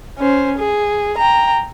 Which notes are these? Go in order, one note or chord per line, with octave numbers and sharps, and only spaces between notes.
C#4 C5
G#4
G5 A#5